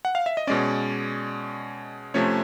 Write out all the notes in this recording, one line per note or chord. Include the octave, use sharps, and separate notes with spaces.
F#5
F5
E5
D#5
B2 G#3 C#4 D5
C3 F3 A3 C#4 C#5